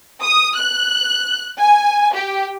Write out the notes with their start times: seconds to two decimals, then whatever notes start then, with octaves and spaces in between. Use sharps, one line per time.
0.23 D#6
0.57 F#6
1.58 G#5
2.15 G4